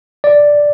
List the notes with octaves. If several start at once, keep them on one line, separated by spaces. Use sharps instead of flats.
D5